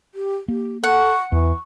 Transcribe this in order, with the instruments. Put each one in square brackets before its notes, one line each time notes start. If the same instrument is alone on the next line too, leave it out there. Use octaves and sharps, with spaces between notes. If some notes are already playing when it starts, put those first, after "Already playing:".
[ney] G4
[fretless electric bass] A#3 [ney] G4
[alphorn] A4 [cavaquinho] F#5 [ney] C#6
[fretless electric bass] E2 [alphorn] E3 [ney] C#6